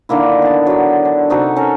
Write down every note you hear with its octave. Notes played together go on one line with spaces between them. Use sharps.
D3 D#3 A#3 E4
B3 A5
F#3 D5
D4
C3 D#4 F#4 A4
C#4 A4 A#4